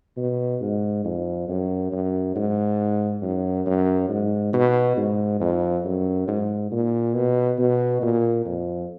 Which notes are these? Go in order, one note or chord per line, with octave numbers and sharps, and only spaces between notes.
B2
G#2
F2
F#2
F#2
G#2
F#2
F#2
G#2
B2
G#2
F2
F#2
G#2
A#2
B2
B2
A#2
F2